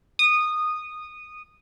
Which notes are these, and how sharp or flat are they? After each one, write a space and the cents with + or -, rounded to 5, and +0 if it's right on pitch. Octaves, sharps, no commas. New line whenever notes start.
D#6 -15